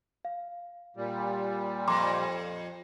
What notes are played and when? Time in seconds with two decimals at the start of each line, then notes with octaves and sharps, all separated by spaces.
0.25 F5
0.97 A#2 G3
1.88 F2 A#5 C6 D6